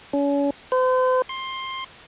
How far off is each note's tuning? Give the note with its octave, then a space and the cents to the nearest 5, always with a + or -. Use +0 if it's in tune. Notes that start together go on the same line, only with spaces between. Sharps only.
C#4 +35
C5 -40
C6 +15